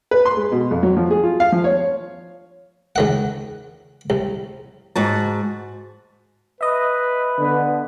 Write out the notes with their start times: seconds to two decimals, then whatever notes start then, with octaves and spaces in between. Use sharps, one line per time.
0.11 B4
0.26 C6
0.37 G#3
0.52 B2
0.71 F2
0.83 F#3
0.97 F3
1.10 G#4
1.24 F4
1.40 F5
1.52 F3
1.64 C#5
2.96 C#2 D#3 F#5
4.10 C2
4.96 G#2 F#4 A5
6.61 B4 D#5 E5
7.39 D3 B3